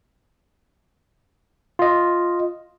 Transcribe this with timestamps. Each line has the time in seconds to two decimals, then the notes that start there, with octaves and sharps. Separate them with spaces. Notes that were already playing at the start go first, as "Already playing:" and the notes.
1.79 F4 D#5